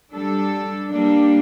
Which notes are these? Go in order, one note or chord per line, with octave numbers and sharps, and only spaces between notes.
G3 D4 A4
G3 A#3 D4